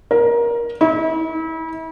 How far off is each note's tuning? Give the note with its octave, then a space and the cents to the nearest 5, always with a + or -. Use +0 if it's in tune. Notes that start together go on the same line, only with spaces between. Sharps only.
A#4 +20
E4 -35